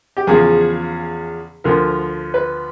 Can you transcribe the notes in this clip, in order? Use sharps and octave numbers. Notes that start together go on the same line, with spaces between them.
G4
E2 C#3 F3 G#4
D2 D3 F3 A#4
B4